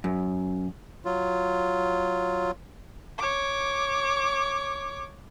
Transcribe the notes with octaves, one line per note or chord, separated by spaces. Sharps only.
F#2
F#3 F4
C#5 D6